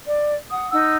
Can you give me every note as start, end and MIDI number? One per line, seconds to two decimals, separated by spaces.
0.06 0.34 74
0.51 0.71 78
0.51 0.71 87
0.71 0.96 63
0.71 0.96 78
0.71 0.96 88